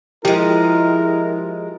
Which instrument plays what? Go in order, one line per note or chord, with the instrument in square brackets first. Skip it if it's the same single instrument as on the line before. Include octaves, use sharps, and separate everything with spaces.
[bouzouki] F3 G#3 [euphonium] E4 [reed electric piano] G4 [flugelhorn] A#4